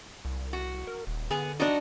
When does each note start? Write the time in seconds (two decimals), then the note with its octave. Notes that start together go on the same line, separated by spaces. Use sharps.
0.25 C2
0.53 F#4
0.87 A#4
1.07 D#1
1.31 D3 B3 G#4
1.60 G2 D4 D#4 F#4 D#5